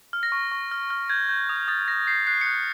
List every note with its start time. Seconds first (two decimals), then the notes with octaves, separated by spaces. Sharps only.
0.13 F6
0.23 A#6
0.32 C#6
0.52 C#6
0.71 F6
0.90 F6
1.10 G6 G#6
1.29 G6
1.49 D#6
1.68 D#6 A6
1.88 G6 A#6
2.07 G6 C7
2.27 F#6 C7
2.41 C#7
2.46 F#6